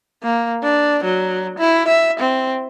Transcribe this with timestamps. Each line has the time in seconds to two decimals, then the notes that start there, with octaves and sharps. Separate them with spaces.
0.23 A#3
0.63 D4
1.04 F#3
1.59 E4
1.88 E5
2.20 C4